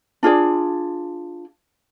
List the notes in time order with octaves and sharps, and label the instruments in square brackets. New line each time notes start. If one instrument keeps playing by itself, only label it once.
[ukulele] D4 F4 G#4 D5